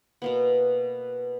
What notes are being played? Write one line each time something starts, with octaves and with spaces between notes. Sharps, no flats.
B2 A#3 B3